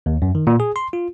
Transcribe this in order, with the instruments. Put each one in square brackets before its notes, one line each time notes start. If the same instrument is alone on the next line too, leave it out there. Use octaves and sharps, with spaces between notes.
[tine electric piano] D#2
F#2
D#3
A#2
G#4
C6
F4